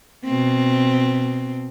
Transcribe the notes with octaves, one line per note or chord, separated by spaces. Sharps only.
B2 C4